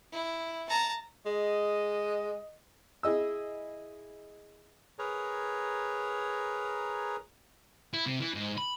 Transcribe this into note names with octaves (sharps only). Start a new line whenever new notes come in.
E4
A5 A#5
G#3 D#5
E4 G#4 D#5 E6
G#4 A#4 B4 C#5 A#5
E4
C3
E3
G#2
B5